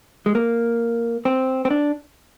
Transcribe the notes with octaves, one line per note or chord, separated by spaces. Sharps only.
G#3
A#3
C4
C4
D4